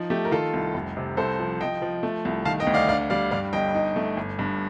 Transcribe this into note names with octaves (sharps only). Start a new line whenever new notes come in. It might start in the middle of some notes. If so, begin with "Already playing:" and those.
Already playing: F3 D#4
A3 G4
A#4
D#3 F4 A4
C2
F1
C3
C2 A4 C5
F3
F3 D#5 G5
F3
A3
C2
D#3 F5 A5
D#5 G5
D2
D5 F5
D4 D5 F5
G3 D5 F5
G2 D5 F5
G1 D#5 G5
D#4
A3
G1
G2